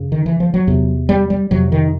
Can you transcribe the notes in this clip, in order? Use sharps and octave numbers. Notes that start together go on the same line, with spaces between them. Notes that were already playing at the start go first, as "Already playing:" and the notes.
Already playing: F#2 C#3
D#3
E3
F3
F#3
E2 C3
G3
G3
F2 C3 F#3
D#3